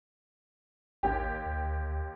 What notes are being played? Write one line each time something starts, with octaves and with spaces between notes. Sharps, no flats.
A1 D#2 G4
D2